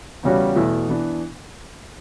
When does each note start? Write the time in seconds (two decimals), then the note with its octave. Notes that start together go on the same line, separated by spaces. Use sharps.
0.23 E2 C#3 G3 C#4 F#4
0.56 E2 B2 A3 E4
0.88 E3 B3 D4